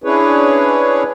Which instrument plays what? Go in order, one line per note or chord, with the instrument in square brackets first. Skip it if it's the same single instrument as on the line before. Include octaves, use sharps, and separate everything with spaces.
[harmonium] C#4 D4 E4 G#4 B4 C#5